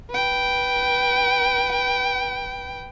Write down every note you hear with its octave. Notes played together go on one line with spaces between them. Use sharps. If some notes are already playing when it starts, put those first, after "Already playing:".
B4 G5